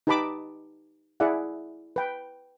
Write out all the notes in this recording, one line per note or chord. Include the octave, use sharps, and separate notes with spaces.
D#4 G4 B4 A5 B5 D6
E4 G#4 D5 E5 F#5
B4 G5